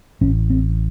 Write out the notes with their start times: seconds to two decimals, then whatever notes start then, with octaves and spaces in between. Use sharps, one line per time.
0.21 A1 A2 C#4
0.50 C4